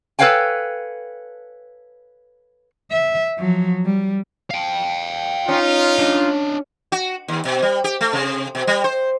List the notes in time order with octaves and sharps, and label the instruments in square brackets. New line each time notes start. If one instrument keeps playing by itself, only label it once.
[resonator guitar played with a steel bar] A4 B4 C#5 F5 G5 G#5
[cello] E5
F3 F#3
G3
[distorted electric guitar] F5 G5
[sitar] C#4 [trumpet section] D#4 F4
[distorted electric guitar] D4 D#5
[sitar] F#4
D#2
B2
G3
G4
A3
C3
B2
G3
C5